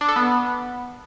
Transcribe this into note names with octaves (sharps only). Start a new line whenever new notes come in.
D4
A4
B3